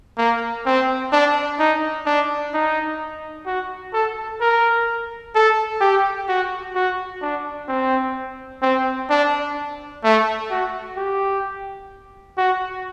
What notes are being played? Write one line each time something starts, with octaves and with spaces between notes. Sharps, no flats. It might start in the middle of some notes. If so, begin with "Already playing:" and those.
A#3
C4
D4
D#4
D4
D#4
F#4
A4
A#4
A4
G4
F#4
F#4
D4
C4
C4
D4
A3
F#4
G4
F#4